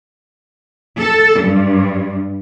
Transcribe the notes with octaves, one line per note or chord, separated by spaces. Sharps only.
A4
G2